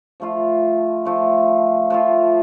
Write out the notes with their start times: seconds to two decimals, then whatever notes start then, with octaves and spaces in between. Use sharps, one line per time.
0.20 F3 A3 F4
1.05 F3 A3 F4
1.90 F3 A3 F4